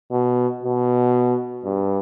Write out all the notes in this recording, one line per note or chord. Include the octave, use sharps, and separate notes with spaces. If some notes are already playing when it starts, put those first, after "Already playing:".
B2
B2
G2